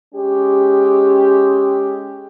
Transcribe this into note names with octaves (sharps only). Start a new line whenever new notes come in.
G#3 C#4 G4